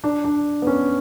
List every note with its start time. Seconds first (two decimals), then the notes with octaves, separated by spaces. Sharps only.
0.04 D4
0.24 D4
0.62 B3
0.67 C#4